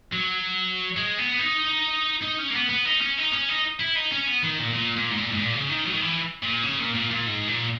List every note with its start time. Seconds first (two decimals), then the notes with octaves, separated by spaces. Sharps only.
0.13 F#3
0.97 G#3
1.18 B3
1.39 D#4
2.22 D#4
2.39 C#4
2.51 A#3
2.54 B3
2.69 B3
2.85 D#4
3.01 C#4
3.18 D#4
3.33 C#4
3.49 D#4
3.80 E4
3.95 D#4
4.12 C#4
4.27 B3
4.43 D#3
4.59 A#2
4.74 A#2
4.96 A#2
5.11 G#2
5.17 A#2
5.32 G#2
5.38 A#2
5.54 C#3
5.69 D#3
5.84 F#3
5.93 D#3
6.00 E3
6.42 A#2
6.63 C#3
6.79 A#2
6.95 A#2
7.11 A#2
7.26 G#2
7.47 A#2